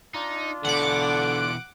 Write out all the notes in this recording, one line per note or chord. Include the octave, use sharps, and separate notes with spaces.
D4 D#4 F4
B2 D3 E3 F#5 D6